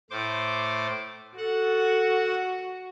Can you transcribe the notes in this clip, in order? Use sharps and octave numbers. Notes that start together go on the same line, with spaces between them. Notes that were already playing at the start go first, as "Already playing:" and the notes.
A2 C5 D6
F#4 A4 F#5